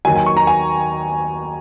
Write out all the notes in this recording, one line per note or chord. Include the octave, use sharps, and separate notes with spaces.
D#2 D#3 F#3 G#5
G#5
C#6
A#5
G#5